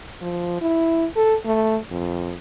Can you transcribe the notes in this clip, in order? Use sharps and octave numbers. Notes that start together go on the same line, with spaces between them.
F3
E4
A4
A3
F2